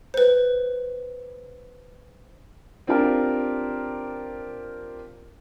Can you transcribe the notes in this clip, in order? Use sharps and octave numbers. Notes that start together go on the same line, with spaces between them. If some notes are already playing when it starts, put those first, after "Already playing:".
B4 C5
C4 D4 F4 G4 A#4